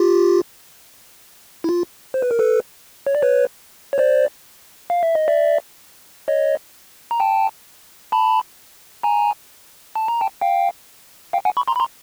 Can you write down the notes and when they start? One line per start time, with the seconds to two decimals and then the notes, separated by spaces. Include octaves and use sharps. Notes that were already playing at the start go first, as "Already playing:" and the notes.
Already playing: F4 G4
1.64 E4
1.69 F4
2.14 C5
2.22 B4
2.31 A#4
2.39 A4 B4
3.07 C#5
3.15 D5
3.22 B4 C#5
3.93 C#5
3.98 C5 D5
4.90 F5
5.03 E5
5.15 D#5
5.28 D5 E5
6.28 C#5 D#5
7.11 A#5
7.20 G5 A5
8.12 A5 B5
9.03 G#5 A#5
9.95 A5
10.08 A#5
10.21 G5 A5
10.41 F5 G5
11.33 F5 G5
11.45 F#5 G#5
11.57 B5 C#6
11.68 A#5 C6
11.76 B5
11.80 A#5 C6